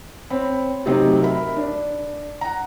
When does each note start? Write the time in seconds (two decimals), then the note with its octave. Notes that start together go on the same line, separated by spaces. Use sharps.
0.30 C4 C#5 B5
0.86 C3 F#3 A3 C4 D#4 G4
1.21 A#4 E5 B5
1.57 D4
2.41 F#5 A#5